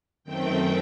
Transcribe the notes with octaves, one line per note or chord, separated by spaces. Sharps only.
F#2 D#3 A3 C4 G5